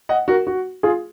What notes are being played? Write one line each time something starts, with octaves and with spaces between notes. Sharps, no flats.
D#5 F#5
F#4 A#4
F#4
F4 G#4